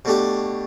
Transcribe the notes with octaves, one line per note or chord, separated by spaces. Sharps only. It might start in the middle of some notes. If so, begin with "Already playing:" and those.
B2 A3 D4 G4